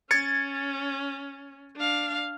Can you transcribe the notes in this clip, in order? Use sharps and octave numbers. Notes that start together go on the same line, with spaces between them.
C#4 G#6 A6 C#7
D4 F5